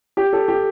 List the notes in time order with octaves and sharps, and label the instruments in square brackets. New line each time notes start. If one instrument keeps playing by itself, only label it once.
[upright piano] G4
A4
G4